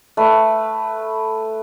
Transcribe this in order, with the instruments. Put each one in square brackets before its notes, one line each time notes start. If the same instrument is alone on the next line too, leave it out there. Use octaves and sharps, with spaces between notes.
[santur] A3 B4